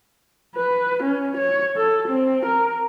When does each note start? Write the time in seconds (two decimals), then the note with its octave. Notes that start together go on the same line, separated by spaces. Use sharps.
0.55 B4
1.03 C#4
1.38 C#5
1.76 A4
2.08 C4
2.46 A#4